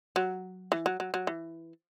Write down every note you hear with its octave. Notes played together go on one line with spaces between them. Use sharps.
F#3
E3
F#3
F#3
F#3
E3